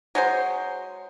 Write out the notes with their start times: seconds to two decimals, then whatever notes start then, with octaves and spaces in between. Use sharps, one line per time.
0.15 F#3 G#3 C5